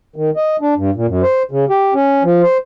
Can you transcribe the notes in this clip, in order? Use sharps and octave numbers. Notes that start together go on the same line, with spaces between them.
D#3
D#5
D4
G2
A#2
F#2
C5
C#3
G4
C#4
F3
C5